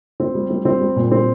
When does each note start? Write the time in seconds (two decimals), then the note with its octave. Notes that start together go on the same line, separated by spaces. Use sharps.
0.20 C4
0.35 G3
0.50 C4
0.65 C4
0.81 G3
0.96 A#2
1.12 C4